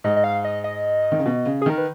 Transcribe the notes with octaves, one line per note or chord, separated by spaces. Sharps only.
G#2 D#5
D#5
F5
D#5
D#5
D#3
C#3
B2
C#3
G#4
D#3 A#4
B4